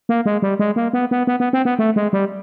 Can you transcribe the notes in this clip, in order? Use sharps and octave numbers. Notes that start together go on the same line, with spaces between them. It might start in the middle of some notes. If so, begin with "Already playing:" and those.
A#3
G#3
G3
G#3
A#3
B3
B3
B3
B3
C4
B3
A3
G#3
G3